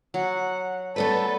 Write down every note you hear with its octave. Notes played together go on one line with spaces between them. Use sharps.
F#3 F#5
A3 B3 A4 B4 D5